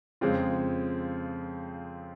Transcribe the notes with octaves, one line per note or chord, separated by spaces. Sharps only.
F2 C#3 G#3 C4 F4